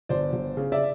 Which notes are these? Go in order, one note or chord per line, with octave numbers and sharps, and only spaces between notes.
G1 C5 D5
G1
C#3
D5 E5